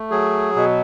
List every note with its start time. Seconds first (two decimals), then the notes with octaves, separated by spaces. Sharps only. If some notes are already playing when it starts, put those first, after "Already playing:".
Already playing: A3
0.11 F#3 G#4
0.56 B2